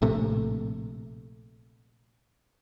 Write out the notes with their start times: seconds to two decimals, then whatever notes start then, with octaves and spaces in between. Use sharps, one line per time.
0.02 A#1 A2 C3 A3